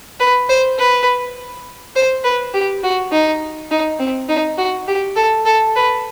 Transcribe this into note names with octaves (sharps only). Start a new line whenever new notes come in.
B4
C5
B4
C5
B4
G4
F#4
D#4
D#4
C4
D#4
F#4
G4
A4
A4
B4